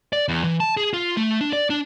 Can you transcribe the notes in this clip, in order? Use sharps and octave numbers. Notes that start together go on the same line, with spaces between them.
D5
E2
E3
A5
G#4
F4
A3
D4
D5
D4